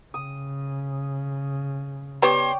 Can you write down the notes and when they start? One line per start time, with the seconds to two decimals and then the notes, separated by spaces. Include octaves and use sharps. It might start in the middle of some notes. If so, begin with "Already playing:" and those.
0.14 C#3 D#6
2.22 B3 G4 B4 C#5 D5 G5 C6